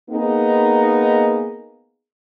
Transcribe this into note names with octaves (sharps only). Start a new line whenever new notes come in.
A#3 B3 D#4 G#4